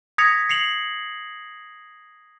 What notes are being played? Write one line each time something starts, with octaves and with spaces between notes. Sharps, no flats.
D#6 G#6 A#6 B6 C#7 F7
C7 C#7 F7 F#7